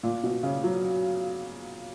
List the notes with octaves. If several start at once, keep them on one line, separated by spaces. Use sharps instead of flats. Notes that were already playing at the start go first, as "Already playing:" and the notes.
A#2
B2
C#3
F#3